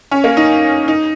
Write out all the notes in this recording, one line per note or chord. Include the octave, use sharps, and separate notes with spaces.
C#4
A#3
D#4
D#4